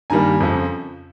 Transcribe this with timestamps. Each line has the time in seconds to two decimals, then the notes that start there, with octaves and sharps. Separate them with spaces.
0.10 G2 D#3 G3 A#3 G#5 A#5
0.40 F2 C#3 F3